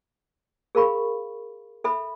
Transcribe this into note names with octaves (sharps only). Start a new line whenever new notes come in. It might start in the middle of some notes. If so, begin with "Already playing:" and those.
G#4 A#4 F5 B5 C#6
A4 E5 B5